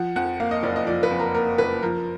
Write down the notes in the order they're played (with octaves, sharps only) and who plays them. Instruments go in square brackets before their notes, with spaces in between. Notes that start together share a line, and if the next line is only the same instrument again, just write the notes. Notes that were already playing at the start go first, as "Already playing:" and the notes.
Already playing: [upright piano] F3 F#5
F2 F#5
A#3 F5
D#5
F#1 D5
D#5
F3 D5
B4
F2
A#4
A#3 A#4
F#1 B4
F3 A#4